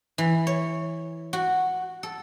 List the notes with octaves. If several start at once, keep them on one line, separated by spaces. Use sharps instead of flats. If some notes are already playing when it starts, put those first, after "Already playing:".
E3
C#5
F#4
A4